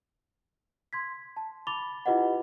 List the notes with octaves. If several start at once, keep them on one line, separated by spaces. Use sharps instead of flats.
C6 G#6 B6
A5
B5 D6 A6 F7 G7
E4 F4 G4 B4 D#5 F#5